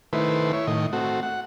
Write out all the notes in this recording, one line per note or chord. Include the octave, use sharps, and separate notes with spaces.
D#3 A3 E4 B4 C5
E4 C#5
A2 D#3 D#5
A3 C4 F#4
F#5